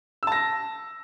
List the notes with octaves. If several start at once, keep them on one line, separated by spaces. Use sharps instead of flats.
A5 E6 A#6